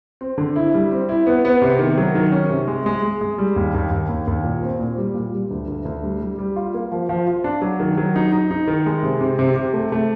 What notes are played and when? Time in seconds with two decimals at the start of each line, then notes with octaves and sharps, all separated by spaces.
0.21 C4
0.38 D3
0.56 E4
0.74 G3
0.91 C4
1.09 E4
1.27 B3
1.45 B3
1.62 C3
1.79 D#3
1.97 F#3
2.15 D#3
2.32 C#4
2.49 C3
2.68 G#3
2.86 G#3
3.03 G#3
3.21 G#3
3.38 G3
3.56 D#2
3.74 D#2
3.91 D#2
4.09 D#2
4.27 D#2
4.44 A#2
4.63 C4
4.79 A#2
4.98 G3
5.14 A#2
5.33 G3
5.51 D2
5.68 D2
5.85 D2
6.03 G3
6.21 G3
6.39 G3
6.56 F4
6.74 A#3
6.92 F3
7.09 F3
7.27 F4
7.44 D4
7.62 F#3
7.80 D#3
7.97 F#3
8.16 D#4
8.32 D#4
8.51 D#4
8.67 D#3
8.86 G#3
9.03 C3
9.21 C3
9.39 C3
9.56 C3
9.73 A3
9.92 A3